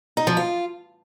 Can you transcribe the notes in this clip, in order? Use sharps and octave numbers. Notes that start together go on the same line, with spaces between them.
D#4
F3
F4